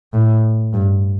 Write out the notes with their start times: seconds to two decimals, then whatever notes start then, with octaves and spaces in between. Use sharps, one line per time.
0.14 A2
0.74 G2